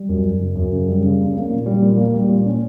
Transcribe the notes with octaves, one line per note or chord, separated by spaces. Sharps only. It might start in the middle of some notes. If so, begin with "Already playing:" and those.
Already playing: G3
F#2
F#2
C#3
F#2
C#3
G3
C#3
A#3
A#3
A#2
G3
A#2
A#3
G3
A#2
C#4